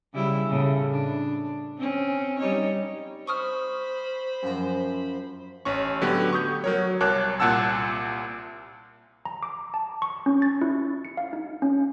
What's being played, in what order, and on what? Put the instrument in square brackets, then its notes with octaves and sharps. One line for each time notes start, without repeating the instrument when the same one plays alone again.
[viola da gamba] C#3 G3 E4
A2 C#3
D4
C4 C#4
G3 D#4 C#5
[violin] C5 B5 [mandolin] C#6 D#6 F6
[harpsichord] F#2 F3 A#5
[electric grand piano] A1 C#4 C#6
D3 F#3 A3 B3 G4
C#6 D#6 G6
F#3 A#4 C#5
C2 A#4 C#5 A5 D6 F#6
C2 A#2 F#5 A5 E6
[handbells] A#5
D6
A5
C#6
C#4
A6
E4
C#7
F5
D#4
C#4